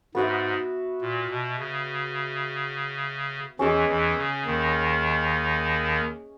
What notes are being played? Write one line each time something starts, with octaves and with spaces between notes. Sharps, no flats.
G#2 B3 F#4 B4 E5
A#2
B2
C#3
E2 E3 C#4 G#4 D#5
E2 E3
C#3
D#2 D#3